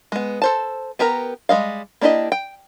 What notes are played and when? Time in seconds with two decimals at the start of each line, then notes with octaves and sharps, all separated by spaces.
0.12 G#3 B3
0.42 A4 C5 A5
0.99 B3 G4 A#4 A#5
1.49 G3 G#3 D#5 F5
2.01 A#3 D4 E4 G4 D#5
2.32 G5